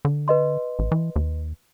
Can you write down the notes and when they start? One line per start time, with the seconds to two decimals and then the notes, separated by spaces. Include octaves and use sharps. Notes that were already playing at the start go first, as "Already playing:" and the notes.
0.05 D3
0.28 B4 D#5 C6
0.79 A1
0.92 E3
1.16 D#2